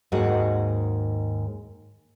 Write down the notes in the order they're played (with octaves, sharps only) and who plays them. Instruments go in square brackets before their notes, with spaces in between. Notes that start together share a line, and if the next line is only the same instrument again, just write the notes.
[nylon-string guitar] D#2 G#2 D#3 F#4 G#4 F#5